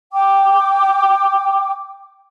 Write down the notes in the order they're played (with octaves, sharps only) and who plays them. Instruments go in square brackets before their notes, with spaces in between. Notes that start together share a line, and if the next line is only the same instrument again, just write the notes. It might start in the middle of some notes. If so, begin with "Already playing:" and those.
[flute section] G5 D6